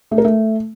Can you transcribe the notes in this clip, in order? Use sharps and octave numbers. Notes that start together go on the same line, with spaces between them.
A3
A#4
A3